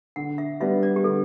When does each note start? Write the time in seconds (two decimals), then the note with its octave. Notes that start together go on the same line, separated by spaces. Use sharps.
0.16 D3 F#5
0.38 E5
0.60 G3 B3 D4 E5
0.83 D5
0.96 G4
1.04 D3 A4